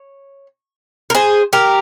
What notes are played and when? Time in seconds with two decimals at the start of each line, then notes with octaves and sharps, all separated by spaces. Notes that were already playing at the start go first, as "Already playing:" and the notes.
Already playing: C#5
1.10 A#4
1.15 G#4 C5
1.53 G4 A#4